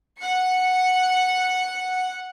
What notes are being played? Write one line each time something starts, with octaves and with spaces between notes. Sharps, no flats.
F#5 C#7